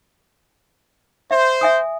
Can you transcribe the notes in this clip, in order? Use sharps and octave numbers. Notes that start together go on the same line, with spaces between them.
C5 E5
E5 G#5 D#6